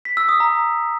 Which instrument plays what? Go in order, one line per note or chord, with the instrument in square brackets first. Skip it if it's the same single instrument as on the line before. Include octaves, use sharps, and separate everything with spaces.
[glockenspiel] B6
E6
D#6
A#5